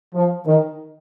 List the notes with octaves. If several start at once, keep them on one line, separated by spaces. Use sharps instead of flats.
F3
D#3